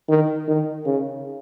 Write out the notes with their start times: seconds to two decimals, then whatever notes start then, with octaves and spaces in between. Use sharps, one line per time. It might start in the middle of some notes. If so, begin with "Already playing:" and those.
0.09 D#3
0.48 D#3
0.86 C#3